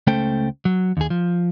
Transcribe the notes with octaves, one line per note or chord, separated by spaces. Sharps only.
C#2 A3 C#4 A4 C5 G5
F#3
D#2 G#4
F3